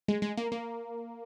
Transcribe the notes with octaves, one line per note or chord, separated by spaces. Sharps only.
G#3
G#3
A#3
A#3